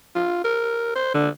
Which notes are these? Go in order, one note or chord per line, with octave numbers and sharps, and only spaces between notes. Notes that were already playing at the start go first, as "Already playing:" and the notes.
F4
A#4
C5
D3